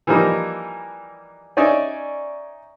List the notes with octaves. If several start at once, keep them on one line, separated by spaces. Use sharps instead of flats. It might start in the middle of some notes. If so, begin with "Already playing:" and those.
E3 F3 G3 A#3 D#4
C#4 D#4 D5 E5 G#5